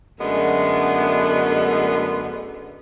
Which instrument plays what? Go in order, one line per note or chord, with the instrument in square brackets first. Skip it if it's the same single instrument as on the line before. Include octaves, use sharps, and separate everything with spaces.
[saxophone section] F#2 D3 G#3 A3 B3